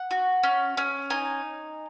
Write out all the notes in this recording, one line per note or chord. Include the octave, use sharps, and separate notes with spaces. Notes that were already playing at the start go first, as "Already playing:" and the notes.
Already playing: F#5
F#4
C#4
C#4
D#4 G#5